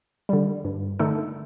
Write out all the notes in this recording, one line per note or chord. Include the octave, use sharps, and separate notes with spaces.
D3 G3
G2
D3 A3 D#4 A4